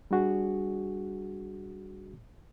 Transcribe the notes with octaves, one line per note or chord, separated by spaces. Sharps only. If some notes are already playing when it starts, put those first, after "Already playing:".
G3 D4 F#4 G#4